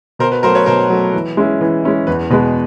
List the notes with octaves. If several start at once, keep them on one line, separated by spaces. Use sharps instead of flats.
B2 A#4 C5
B4
F#3 A3 A#4 C5
B4 C#5
B2 A#4 C5
F#3 A3
E3
G#3 C#4 E4
E3
G#3 C#4 E4
E2 B4
B2 G#3 B4